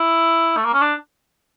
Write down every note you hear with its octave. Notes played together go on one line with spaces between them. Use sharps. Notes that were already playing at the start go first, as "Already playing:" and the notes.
Already playing: E4
A3
A#3
C#4
D4